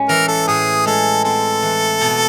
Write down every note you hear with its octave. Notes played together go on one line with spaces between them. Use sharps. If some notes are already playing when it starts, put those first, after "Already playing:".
Already playing: A2 G#3 C#4
E3 A#4
A4
A2 G#4
G#3 A4
C4 A4
E3
B2